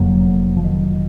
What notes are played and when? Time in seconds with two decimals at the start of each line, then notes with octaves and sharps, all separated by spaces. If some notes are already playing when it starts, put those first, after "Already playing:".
Already playing: F1 F2 D3 F#3 A#3
0.57 F3
0.64 D#3 F#3